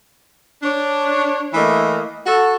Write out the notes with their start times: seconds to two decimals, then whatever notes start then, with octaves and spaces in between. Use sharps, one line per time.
0.63 D4 C#5
1.53 E3 A3 A#3 D#5
2.26 F#4 A4